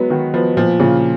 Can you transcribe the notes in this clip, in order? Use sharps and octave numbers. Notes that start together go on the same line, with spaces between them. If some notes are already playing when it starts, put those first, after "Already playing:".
Already playing: F#3 G#3 B3
D#3 F#4
F3 B3
A#2 F3
A#2 C#3